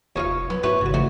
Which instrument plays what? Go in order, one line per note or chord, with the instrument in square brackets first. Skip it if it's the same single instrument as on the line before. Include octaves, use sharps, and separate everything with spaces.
[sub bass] F1 [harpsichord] D#2 F4 F5 [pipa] D#4 C#5
[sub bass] F#3 [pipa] B3
[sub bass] G#2 [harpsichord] B3 E4 F#4 [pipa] B4 C#5
[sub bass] G#1 [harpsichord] C#3 F#4
[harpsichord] D2 D3 E3 [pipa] F#4